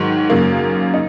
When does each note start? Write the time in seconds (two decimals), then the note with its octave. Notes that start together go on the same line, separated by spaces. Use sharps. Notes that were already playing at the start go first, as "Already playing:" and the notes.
Already playing: G#2 D#3 F#3
0.30 F#2 C#3 A#3
0.94 D#4